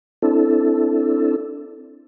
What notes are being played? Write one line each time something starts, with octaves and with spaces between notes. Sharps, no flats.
C4 D4 E4 A4